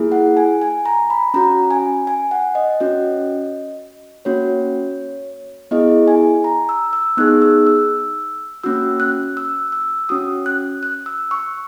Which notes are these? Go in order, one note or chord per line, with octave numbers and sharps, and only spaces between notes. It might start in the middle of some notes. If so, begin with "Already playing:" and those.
Already playing: A#3 E4 G#4
F#5
G#5
G#5
A#5
B5
C#4 F#4 A#5
G#5
G#5
F#5
D#5
C#4 F#4
A#3 C#4 F#4 C#5
B3 E4 G#4 D#5
G#5
A#5
E6
E6
B3 D#4 G#4 F#6
E6
E6
A#3 C#4 F#4 E6
F#6
E6
E6
C#4 F#4 D#6
F#6
F#6
E6
C#6